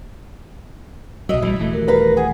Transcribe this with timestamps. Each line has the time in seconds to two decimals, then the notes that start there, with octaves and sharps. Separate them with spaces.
1.29 B1 F#3 F#4 D#5 E5
1.42 A#1 E3 G3 E4
1.59 D#1 E3 A3
1.73 F#4 G4 A#4
1.88 A#4 B4 F5 A#5
2.17 G#4 F#5